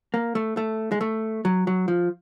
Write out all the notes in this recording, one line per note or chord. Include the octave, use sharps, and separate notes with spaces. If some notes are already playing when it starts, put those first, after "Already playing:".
A#3
A3
A3
G#3
A3
F#3
F#3
F3